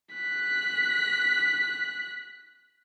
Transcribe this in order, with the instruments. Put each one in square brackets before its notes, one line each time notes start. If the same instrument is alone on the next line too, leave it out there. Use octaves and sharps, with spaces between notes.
[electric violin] F#6 B6